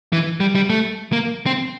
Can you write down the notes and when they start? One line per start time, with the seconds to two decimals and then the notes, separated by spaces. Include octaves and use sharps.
0.13 E3
0.40 G3
0.55 G3
0.70 A3
1.13 A#3
1.46 C4